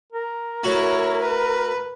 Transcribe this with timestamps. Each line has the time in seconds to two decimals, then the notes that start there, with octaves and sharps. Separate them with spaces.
0.12 A#4
0.64 A3 E4 F#4 C#5
1.22 B4